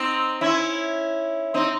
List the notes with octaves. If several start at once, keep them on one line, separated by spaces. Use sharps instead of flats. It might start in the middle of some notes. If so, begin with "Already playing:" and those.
Already playing: C4 D#4
C#4 E4
C4 D#4